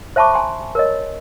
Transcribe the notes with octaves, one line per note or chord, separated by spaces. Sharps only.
C5 E5 A5 B5 C#6 D6
G#5 A#5 C6
A#4 C#5 D#5